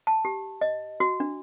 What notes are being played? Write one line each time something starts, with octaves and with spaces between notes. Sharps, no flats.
A5
G4
D#5
F#4
D4